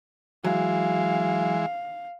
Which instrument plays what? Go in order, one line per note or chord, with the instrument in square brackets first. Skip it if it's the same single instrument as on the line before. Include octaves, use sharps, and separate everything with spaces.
[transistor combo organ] E3 G#3 [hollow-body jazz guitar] F#3 [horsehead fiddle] F5